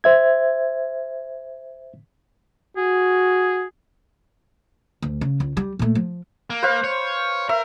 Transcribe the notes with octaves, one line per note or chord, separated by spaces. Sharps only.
C5 E5 G#6
F#4 G#4
D2
C#3
C#2
G3
A#2 A3
F3
A#3
B4 C5 F5
C#5
A#4 E5